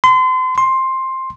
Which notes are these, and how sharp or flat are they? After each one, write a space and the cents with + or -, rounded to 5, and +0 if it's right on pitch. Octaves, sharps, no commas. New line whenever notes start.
C6 -35
C6 +10